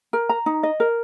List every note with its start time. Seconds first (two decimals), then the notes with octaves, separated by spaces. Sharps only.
0.13 A#4
0.29 A#5
0.46 D#4
0.63 D#5
0.80 A#4